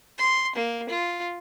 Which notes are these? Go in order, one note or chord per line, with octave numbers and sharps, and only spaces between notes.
C6
A#3
F4